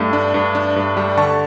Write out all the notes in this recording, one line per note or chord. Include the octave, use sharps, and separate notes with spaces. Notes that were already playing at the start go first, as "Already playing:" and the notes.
Already playing: G2 A3
D4
G2
D4
G2
G3
D3 A5 C#6